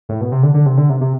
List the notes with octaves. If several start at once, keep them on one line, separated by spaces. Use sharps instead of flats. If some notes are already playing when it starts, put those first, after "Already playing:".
A2
B2
C3
D3
D3
C3
D3
C3
C3